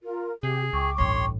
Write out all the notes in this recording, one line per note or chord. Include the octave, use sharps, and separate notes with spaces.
F4 A#4
C3 G4 G#4
C#2 G5 C#6 D6
A1 G2 C#5 C6